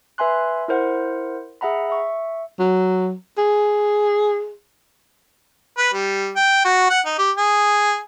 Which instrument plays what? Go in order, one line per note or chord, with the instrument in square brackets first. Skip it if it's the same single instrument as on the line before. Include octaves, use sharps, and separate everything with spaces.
[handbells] B4 E5 G#5 C6 F#6
E4 A#4 C5 F#5
G#4 E5 F#5 A#5 B5
E5 C#6
[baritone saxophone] F#3
G#4
[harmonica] B4
G3
G5
F#4
F#5
D#4
G4
G#4